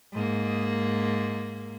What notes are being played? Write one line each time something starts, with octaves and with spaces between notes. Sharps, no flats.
G#2 A#3